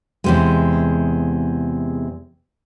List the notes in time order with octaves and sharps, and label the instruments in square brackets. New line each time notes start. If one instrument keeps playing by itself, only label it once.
[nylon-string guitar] E2 C3 G#3